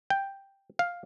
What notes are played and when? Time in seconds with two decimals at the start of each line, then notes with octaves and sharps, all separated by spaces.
0.10 G5
0.79 F5